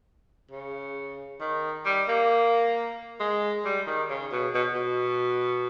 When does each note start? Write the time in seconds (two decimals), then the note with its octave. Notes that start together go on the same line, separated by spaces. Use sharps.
0.51 C#3
1.41 D#3
1.86 G3
2.08 A#3
3.20 G#3
3.65 G3
3.87 D#3
4.10 C#3
4.32 B2
4.55 B2
4.75 B2